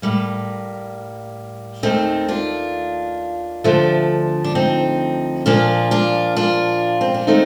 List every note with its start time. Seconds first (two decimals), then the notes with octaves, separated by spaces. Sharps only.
0.02 A2 G3 A#3
1.83 D#2 D#3 A3 C4 D#4
2.28 D4 F4
3.64 D2 D3 F3 A3
4.44 D4
4.55 C4 D#4
5.46 A#2 F3 A#3 D4 F4
5.91 D4 F4
6.37 D4 F4
7.01 C4
7.14 D4
7.27 D#3 A3 C4 D#4